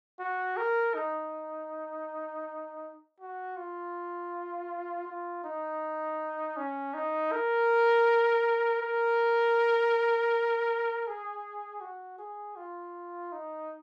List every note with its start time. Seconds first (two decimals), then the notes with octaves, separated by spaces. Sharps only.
0.20 F#4
0.57 A#4
0.95 D#4
3.20 F#4
3.57 F4
5.07 F4
5.44 D#4
6.57 C#4
6.94 D#4
7.32 A#4
8.82 A#4
11.07 G#4
11.81 F#4
12.19 G#4
12.56 F4
13.32 D#4